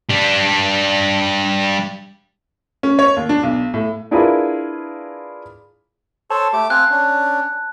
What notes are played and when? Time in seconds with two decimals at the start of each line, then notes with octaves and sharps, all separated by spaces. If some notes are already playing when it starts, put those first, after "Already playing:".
0.10 G3 D4
2.83 C#4
2.99 C#5
3.16 D#2
3.29 D4
3.43 B1
3.74 A2
4.11 D4 E4 F4 G#4 A#4 B4
6.30 A4 C5 C#5 A5
6.53 A3 G4 D6
6.70 C4 F5 G#5 F#6
6.91 C#4 D4